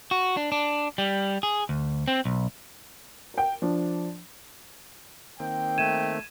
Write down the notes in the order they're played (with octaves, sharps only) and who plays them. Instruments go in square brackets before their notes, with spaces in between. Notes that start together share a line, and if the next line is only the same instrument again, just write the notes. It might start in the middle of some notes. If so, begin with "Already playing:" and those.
[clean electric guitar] F#4
D4
D4
G3
G#4
D2
C4
B1
[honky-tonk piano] A#4 G5
F3 D4
[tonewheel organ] D#3 A#3 C4 [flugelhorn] G5
[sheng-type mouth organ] A3 [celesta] G#6 D#7 E7